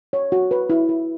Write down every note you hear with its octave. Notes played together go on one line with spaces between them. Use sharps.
C#5
F#4
B4
E4
B4